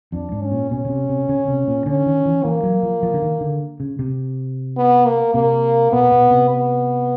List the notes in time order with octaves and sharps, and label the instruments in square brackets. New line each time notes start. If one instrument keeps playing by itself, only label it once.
[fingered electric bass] F2 [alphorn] D4
[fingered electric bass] G#2
[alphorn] C#4
[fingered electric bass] A#2
[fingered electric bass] B2 [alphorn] C#4
[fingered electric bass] C#3
C3
C3
C#3
C3
A#2
[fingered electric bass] D3 [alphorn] C#4
[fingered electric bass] D#3
E3
[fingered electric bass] E3 [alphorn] A#3
[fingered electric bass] F#3
F3
F3
D3
D#3
D3
C#3
C3
[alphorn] B3
A#3
[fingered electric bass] C3 [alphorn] A#3
[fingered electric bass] B2 [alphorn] B3
[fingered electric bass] B2
C3
[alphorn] B3